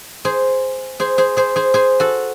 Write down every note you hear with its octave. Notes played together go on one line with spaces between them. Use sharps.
G#4 C5
G#4 C5
G#4 C5
G#4 C5
G#4 C5
G#4 C5
F#4 A4